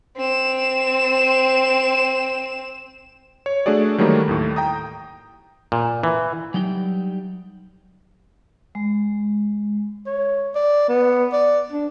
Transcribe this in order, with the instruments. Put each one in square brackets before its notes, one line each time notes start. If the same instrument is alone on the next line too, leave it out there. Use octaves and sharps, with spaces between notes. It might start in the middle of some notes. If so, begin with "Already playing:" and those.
[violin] C4 E7
[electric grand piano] C#5
A3 D4 F#4 G#4 D5
D#3 E3 F#3 G3 A3 A#3
D#2 A2
G5 A#5 D#6
[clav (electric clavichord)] A#2
E3
[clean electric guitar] F#3 G3 D#4 G5
[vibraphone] G#3
[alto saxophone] C#5
D5
B3
D5
D4